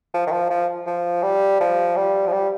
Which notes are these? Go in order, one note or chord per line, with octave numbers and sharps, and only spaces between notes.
F3
D#3
F3
F3
F3
G3
F3
G3
F3
G3